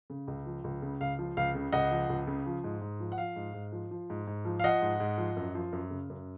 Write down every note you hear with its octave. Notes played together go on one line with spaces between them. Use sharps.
C#3
C#2
F3
C#2
C#3
C#2 F5
F3
C#2 F5
C#3
C#2 D#5 F#5
F3
C#2
C#3
F3
G#2
G#2
F3
F#5
F3 F5
G#2
G#2
F3
F3
G#2
G#2
F3
F5
F3 D#5 F#5
G#2
G#2
F3
F#2
F3
F#2
C#3
F#2